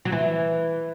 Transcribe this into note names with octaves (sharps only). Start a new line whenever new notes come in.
F#3
E3